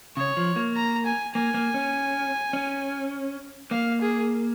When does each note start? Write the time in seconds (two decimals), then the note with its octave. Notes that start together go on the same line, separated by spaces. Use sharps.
0.17 C#3 C#5
0.37 F3
0.56 A#3
0.76 A#5
1.06 G#5
1.35 A#3 G#5
1.54 A#3
1.74 C#4
2.53 C#4
3.71 A#3 F5
4.01 G#4